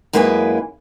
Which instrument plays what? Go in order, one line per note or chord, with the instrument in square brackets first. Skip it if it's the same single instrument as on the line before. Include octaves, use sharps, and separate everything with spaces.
[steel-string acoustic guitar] F#2 G#3 A#3 E4 B4 G#5